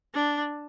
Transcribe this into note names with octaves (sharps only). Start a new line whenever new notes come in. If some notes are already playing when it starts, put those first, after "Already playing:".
D4